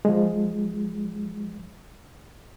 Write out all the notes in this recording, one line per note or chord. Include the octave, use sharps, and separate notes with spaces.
F3 G#3